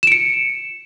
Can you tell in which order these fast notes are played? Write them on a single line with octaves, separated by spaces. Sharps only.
E7 D7 C#7